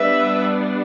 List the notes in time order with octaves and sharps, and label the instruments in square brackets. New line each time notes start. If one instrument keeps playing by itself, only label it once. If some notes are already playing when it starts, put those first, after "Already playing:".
Already playing: [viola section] G3 B3 D4 B4 E5